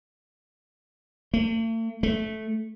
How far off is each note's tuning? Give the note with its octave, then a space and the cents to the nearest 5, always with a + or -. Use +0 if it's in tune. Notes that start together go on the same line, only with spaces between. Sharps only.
A3 +45
A3 -15